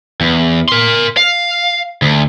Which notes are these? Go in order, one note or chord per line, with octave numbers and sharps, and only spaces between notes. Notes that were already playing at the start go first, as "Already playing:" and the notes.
E2
A#4 C6
F5
D2